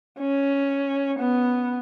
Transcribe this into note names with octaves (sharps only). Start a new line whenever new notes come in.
C#4
B3